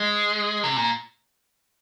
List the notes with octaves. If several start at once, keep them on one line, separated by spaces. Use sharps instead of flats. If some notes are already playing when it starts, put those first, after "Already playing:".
Already playing: G#3
C3
A#2